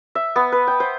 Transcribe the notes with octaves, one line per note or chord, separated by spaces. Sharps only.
E5
B3
B4
G5
C5